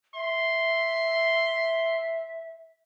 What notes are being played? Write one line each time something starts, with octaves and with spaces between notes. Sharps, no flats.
E5 C6